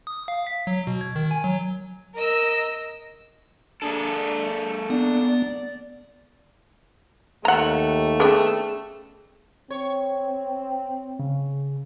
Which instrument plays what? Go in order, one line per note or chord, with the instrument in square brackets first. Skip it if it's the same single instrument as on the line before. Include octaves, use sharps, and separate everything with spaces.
[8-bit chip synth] D#6
F5
B6
F#3
B2
G#6
D#3
G#5
F#3
[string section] A#4 D#5 E6
[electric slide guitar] A#3 G#4 A4 [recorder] D4
[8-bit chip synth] B3 [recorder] D4
[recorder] D5
[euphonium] D#2 [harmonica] A3 [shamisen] F#5 A#5
[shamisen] B3 D4 [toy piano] C#4 G#4
[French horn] C4 [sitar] C#5
[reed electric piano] C#3